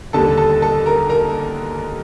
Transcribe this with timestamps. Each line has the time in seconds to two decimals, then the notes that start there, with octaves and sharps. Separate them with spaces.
0.13 D#2 D3 G3 A4 A5
0.37 A4 A5
0.62 A4 A5
0.86 A#4 A#5
1.10 A#4 A#5